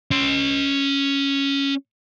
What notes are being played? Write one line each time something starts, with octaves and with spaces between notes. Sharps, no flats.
C#4 C6